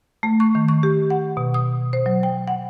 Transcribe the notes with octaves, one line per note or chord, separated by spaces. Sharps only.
A3
C#6
D#3
C#6
G4
F#5
B2
D#6
C5
F#3
G5
F#5